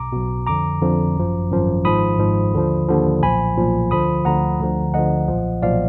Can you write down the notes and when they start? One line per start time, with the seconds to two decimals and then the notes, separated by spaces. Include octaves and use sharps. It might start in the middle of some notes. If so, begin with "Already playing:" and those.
Already playing: B1 B2 A#5 D6
0.12 B1 B2
0.47 F2 D3 F3 A#5 D6
0.82 F2 D3 F3
1.16 G#1 F#2 F3
1.50 G#1 F#2 F3
1.85 G#1 G#2 F3 B5 D#6
2.19 G#1 G#2 F3
2.53 D#2 D3 F3
2.89 D#2 D3 F3
3.22 B1 A#2 F3 G#5 B5
3.57 B1 A#2 F3
3.91 D2 D3 F3 B5 D#6
4.25 D2 D3 F3 F#5 A#5
4.60 D2 D3 F3
4.94 D2 D3 F3 D#5 F#5
5.28 B1 A#2 F3
5.63 B1 A#2 F3 D5 F5